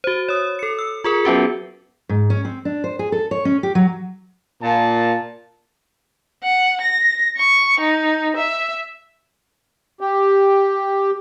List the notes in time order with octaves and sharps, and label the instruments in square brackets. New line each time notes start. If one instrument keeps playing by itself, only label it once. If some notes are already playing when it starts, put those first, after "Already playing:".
[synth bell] F#4 C5
C#5 D#6
A4 C#7
E6
F4 G#4 A#4
F#3 B3 C#4 F#4
[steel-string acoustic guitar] G#2
C#4
C4
D4
C5
G#4
A4
C#5
C#4
G4
F#3
[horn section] A#2 A5
[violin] F#5
A#6
C#6
D#4
E5
[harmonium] G4